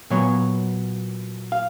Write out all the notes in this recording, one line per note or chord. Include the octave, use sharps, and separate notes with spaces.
A#2 F#3 B3 C#5
F5